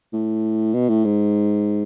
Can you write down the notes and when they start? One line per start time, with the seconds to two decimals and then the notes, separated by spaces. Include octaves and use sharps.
0.13 A2
0.74 B2
0.89 A2
1.05 G#2